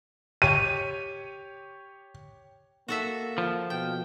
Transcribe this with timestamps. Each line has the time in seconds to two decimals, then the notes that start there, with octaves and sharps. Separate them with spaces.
0.42 G4 C#5 D#7
2.88 A#3 F#4 A4 E5
3.38 F3
3.70 B2 G5